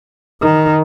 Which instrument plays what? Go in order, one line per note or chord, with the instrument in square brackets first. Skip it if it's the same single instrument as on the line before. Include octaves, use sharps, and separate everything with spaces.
[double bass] D#3